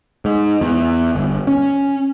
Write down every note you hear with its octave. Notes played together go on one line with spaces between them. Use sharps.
G#2
E2
G1
C#4